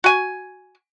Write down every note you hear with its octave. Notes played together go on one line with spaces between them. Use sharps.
F#4 G#5